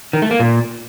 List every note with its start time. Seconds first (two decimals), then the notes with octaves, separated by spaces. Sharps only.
0.13 D#3
0.22 A3
0.31 A#3
0.40 A#2